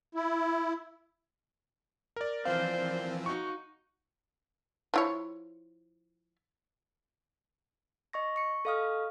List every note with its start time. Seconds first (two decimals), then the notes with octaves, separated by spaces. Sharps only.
0.15 E4
2.16 A#4 D5
2.45 E3 F3 C4 C5 F5
3.26 D#4 F#4 C#6
4.94 F3 E4 C#5
8.13 D#5 C#6 A#6
8.36 C#6 C#7
8.65 A4 D#5 F5 C#6 D#6 F6